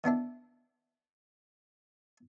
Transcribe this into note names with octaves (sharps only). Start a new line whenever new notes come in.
D#3 B3 D4 E4